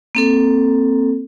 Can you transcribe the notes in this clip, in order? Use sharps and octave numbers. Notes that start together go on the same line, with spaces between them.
A#3 C4 A4